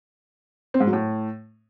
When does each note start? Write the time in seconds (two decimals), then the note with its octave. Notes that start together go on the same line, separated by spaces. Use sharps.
0.74 C4
0.80 G#2
0.86 F#3
0.93 A2